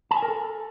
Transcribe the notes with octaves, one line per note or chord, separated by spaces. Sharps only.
A5
G#5
A#4
A4